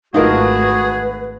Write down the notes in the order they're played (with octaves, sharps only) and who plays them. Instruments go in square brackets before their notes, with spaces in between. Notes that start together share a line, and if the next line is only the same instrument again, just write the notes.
[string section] G#1 A3 [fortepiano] D#4 F4 A#4 [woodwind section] F#4 G#4 [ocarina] B4